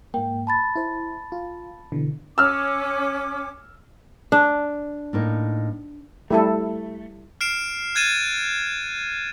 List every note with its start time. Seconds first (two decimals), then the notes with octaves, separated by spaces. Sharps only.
0.14 G#2 A#3 G5
0.47 A5 B5 A6
0.76 E4 C5
1.32 F4
1.92 B2 D3 E3
2.38 C#4 D6 E6 F6
4.32 D4
5.13 A2 A#3 D#4
6.31 G3 A3 E4 A4
7.41 F6 C7 D7 E7
7.95 F#6 G#6 A6 D#7 E7